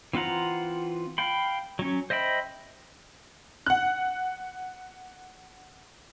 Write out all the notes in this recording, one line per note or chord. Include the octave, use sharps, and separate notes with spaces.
E3 C4 F4 F#5 A#5
F5 G5 B5
F#3 C#4
C5 D#5 E5 G5 B5
F#5 F#6